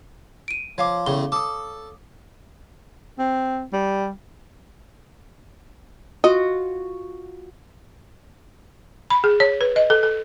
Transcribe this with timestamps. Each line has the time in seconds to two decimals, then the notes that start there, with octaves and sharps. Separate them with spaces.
0.48 D7 D#7
0.78 F3 C#5 F5 D6
1.06 E2 A2 C#3 G7
1.32 A4 D6 D#6
3.19 C4
3.73 G3
6.24 F4 F#4 D#5
9.10 B5
9.24 G#4
9.40 C#5
9.61 B4
9.76 D#5
9.90 A4
10.03 A4